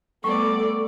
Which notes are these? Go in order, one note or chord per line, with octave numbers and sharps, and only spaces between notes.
G3 A3 B3 A4 D5 C#6